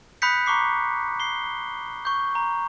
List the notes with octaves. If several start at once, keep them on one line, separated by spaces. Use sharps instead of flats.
B5 D#6 F#6 G6 B6 C#7
A#5 C#6 D6 C7
C7 G7
C#6 G6
A#5